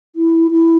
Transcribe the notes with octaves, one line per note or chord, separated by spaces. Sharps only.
E4
E4